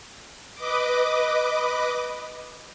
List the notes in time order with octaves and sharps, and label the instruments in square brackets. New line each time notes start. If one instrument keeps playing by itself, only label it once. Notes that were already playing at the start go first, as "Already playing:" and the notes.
[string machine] B4 D#5 D6